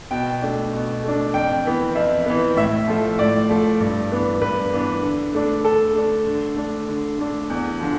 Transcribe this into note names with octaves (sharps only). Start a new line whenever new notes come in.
B2 G5
A3 D4
B2
A3 D4
F2 G5
E3 B3
F2 E5
E3 B3
A2 E5
F3 A3
A2 D5
F3 A3
G2
E3 B3 D4
G2 B4
E3 B3 D4
D3
A3 D4
D3 A4
A3 D4
D3
A3 D4
D3
A3 D4
E2
D3 F3